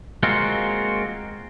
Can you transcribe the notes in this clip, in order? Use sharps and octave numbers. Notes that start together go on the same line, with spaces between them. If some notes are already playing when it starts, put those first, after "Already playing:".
G#3 A#3 C4 F4 F#4